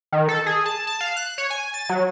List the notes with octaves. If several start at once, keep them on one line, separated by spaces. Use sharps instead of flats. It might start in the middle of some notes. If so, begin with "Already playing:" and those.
D#3
A4
G#4
A5
A5
F5
F#6
C#5
G#5
A6
F#3